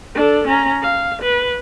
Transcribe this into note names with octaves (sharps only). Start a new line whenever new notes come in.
D4 A4
C#4 A#5
F5
B4